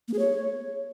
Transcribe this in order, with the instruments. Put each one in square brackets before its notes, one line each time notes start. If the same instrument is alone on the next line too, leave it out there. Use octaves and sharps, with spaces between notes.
[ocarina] A#3
G#4
C#5